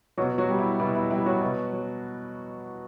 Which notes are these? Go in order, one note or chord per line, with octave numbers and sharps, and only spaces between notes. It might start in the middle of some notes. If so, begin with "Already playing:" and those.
B2 F#3 F#4
F#3 F#4
G3
E4
B2 E4
E4
G3 E4
F#3 F#4
B2
F#3